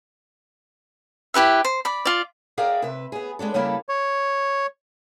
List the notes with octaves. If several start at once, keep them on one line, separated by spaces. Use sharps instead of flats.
E4 G4 B4 E5
C5
D5 B5
F4 D5
G#4 A#4 D5 E5 F5 G5
C3 B4 E5
B3 G#4
G#3 B3 D4 A4
C#3 G3 A#3 E4 A4
C#5